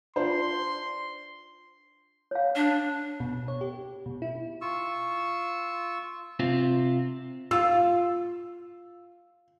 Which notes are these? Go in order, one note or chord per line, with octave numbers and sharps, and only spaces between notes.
D4 F4 C5 C6
C#5 F5
D4
B2
C#5
G4
B2
E4
F4 C#6 E6
C3 C4 F4
F4 E6